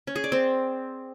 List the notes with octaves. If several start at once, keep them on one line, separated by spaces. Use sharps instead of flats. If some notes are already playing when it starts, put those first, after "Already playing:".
C#4
G#4
D5
C4